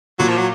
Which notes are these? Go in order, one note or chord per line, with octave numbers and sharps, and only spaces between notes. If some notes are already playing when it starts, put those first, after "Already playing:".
A#2 F#3
F3
F#3